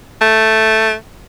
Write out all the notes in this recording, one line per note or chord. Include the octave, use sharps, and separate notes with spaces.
A3